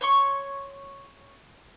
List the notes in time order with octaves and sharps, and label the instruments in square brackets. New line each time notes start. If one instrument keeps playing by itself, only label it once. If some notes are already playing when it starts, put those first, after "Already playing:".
[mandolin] C#5 C6 C#6